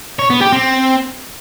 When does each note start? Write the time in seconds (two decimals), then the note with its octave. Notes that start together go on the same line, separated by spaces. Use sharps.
0.19 C#5
0.30 B3
0.41 G4
0.53 C4